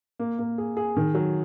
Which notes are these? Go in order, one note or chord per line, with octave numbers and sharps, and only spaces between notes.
A#3
A#3
G#4
G#4
D#3
F#3